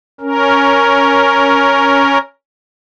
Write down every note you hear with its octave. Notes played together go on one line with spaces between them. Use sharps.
C#4 A#4